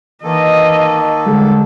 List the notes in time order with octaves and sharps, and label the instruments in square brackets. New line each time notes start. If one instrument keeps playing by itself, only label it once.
[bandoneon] D#3 A#3 A4 [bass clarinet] E3 [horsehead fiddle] D#5
[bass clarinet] D3 [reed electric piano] G3 G#3